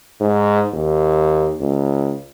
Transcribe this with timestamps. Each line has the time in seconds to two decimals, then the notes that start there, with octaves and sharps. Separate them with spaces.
0.21 G#2
0.73 D#2
1.60 C#2